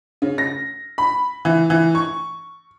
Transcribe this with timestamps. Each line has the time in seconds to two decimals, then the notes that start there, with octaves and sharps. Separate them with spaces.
0.22 C#3
0.38 A#6
0.98 B5
1.45 E3
1.70 E3
1.95 C#6